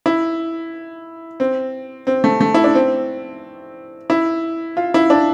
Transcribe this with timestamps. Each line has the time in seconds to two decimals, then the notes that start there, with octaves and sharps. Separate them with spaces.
0.06 E4
1.40 C4
2.07 C4
2.24 A3
2.41 A3
2.54 E4
2.64 D4
2.75 C4
4.10 E4
4.77 F4
4.94 E4
5.10 D4